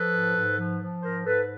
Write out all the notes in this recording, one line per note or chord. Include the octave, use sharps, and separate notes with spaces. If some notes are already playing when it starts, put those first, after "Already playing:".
Already playing: F3 A4 B4
G#2
G#2
F3
F3
G#2 A#4 C5
G#2 A4 B4